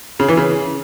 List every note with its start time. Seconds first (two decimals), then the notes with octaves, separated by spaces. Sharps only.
0.20 C#3
0.28 E3
0.37 C#3